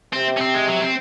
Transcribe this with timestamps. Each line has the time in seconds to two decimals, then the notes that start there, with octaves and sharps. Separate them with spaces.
0.13 C3 C4
0.37 C#4
0.41 C4
0.54 G#3
0.68 F#3
0.81 C4